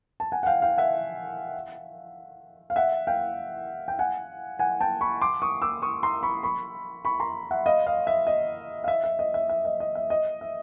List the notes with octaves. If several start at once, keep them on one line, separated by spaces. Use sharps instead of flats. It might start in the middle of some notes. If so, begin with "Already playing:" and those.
A5
F#5 G#5
F#5
F5 G5
F5 G5
E5 F#5
F5
E5 F#5
F5 G5
G5
F#5 G#5
F#5 G#5
G5 A5
B5 C#6
C6 D6
C#6 D#6
D6 E6
C#6 D#6
A#5 C6
B5 C#6
B5 C#6
B5 C#6
A#5 C6
E5 F#5
D#5 F5
D#5 F5
E5
D#5
F5
E5
E5
D#5
E5
E5
D#5
D#5
E5
D#5
E5